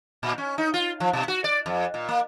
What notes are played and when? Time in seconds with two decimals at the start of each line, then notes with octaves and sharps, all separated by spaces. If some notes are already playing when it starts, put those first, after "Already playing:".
0.23 A#2
0.38 C#4
0.58 D#4
0.74 F4
1.00 F3
1.13 B2
1.28 F#4
1.44 D5
1.66 F2
1.94 A#2
2.09 A#3